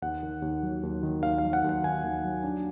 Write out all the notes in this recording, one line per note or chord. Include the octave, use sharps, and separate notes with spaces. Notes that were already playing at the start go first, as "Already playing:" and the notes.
D#2 F#5
D#3
D#2
F#3
D#2
D#3
D#2 F5
F5
F#3
F#5
D#2
F#5
D#3 G#5
D#2
F#3
D4